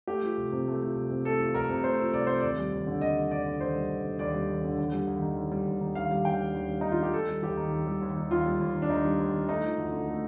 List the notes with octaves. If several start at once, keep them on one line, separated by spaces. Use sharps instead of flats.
A3 G4
F3
C2
C3
A3
F3
C2
C3
A3 A4
F3
C2 A#4
C3
A3 C5
F3
C2 D5
C3 C5
D#2 D5
G3
D#2
D3
D#2 D#5
G3
D#2 D5
D3
D#2 C5
G3
D#2
D3
D#2 D5
G3
D#2
D3
D#2
G3
D#2
D#3
D#2
G3
D#2
D#3
D#2 F5
G3
D#2 G5
D#3
D#2
G3
D#2 D#4
F4
D#3 G4
D#2 A4
G3
D#2 G4
D#3
D#2
G3
D#2
D#3
D#2 F4
G3
D#2
D#3
D4
D#2 D#4
G3
D#2
D#3
A3 D#4
F3
D2
D3
A3